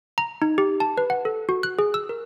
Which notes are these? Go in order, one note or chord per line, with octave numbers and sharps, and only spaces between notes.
A#5
D#4
G4
A5
B4
F#5
A4
F#4
F#6
G#4
E6
A#4